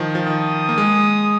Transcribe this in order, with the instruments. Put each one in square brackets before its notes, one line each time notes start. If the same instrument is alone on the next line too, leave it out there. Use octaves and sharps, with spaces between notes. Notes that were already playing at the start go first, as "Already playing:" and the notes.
Already playing: [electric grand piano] D#3 F3
F3
[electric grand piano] D#3 [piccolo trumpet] D#6
[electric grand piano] A#3
G#3